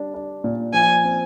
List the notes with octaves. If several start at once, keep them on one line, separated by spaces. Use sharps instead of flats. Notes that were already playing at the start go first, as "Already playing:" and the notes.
Already playing: G3 D4
D4
A#2
F3 G#5
C4